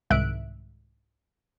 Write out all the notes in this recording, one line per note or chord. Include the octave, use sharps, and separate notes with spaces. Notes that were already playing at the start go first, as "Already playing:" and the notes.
C2 G#2 D#3 E5 F#6 D7